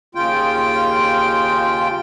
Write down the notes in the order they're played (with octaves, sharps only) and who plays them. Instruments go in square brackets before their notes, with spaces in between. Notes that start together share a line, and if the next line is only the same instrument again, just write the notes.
[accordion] D#2 C#3 F4 G5